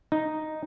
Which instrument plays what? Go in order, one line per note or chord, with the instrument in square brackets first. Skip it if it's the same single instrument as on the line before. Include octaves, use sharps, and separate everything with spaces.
[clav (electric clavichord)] D#4